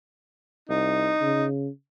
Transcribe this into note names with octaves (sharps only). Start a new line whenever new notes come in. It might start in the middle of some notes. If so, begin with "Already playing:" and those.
C2 D#4
C#3